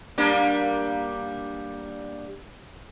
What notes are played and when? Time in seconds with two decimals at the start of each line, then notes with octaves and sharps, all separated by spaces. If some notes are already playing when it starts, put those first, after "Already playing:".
0.18 G3 A#3 D4